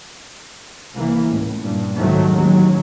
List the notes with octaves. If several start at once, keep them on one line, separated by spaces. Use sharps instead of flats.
C2 E3 A#3
C#2 A2
G2 A#2
C2 G#2 C3 D#3 F#3 A3
A1 D#2 B2 F#3 G#3